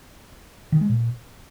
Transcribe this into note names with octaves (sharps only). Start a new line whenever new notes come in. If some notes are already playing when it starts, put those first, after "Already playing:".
D#3
G#3
A#2